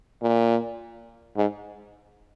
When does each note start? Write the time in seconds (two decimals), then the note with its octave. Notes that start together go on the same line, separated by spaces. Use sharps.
0.22 A#2
1.36 G#2